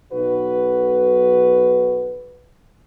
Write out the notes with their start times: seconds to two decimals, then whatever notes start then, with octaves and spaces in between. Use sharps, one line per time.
0.12 B1 F#4 B4